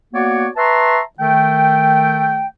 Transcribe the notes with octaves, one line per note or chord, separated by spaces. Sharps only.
A#3 B3 F#4 C#5 D5 F#5
B4 E5 A5 A#5 C6 C#6
D#3 A3 G5